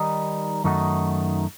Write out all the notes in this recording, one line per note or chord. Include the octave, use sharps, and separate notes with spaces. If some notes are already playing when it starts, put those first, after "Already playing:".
Already playing: D#3 G3 D#4
F#2 D#3 A3 D#4 F#4